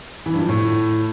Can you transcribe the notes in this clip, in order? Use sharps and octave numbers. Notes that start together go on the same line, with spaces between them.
E3
G2
F3
A2